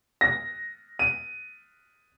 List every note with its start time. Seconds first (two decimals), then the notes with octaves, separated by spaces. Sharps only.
0.21 A#6
0.99 D#7